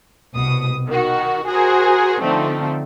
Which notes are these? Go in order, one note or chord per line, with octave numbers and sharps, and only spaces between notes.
C2 B2 D#6
D#3 F#4
F#4 G#4 A#4 C5
D3 F3 A3 C4 D#4